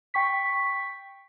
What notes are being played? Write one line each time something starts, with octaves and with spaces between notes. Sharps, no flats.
G5 C#6 B6